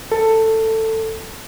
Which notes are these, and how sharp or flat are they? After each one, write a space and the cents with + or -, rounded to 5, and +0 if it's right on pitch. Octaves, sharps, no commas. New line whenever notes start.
A4 +15